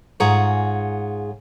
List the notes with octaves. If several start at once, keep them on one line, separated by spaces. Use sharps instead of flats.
G#2 F4 G#4 C#5 F#5 A#5